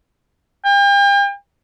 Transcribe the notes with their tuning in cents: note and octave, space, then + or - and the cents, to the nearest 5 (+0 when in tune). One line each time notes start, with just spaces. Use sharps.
G5 +40